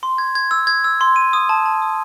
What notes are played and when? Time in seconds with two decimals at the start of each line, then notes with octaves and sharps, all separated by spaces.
0.03 C6
0.18 G#6
0.35 G#6
0.51 E6
0.67 G#6
0.84 E6
1.01 C6
1.16 D#7
1.33 D#6
1.49 A5
1.66 A5
1.82 D#6